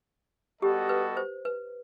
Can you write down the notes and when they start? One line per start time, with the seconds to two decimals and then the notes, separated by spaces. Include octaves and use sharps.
0.62 G3 B3 F#4 G4 A4 D#5
0.89 B4
1.17 C5
1.45 B4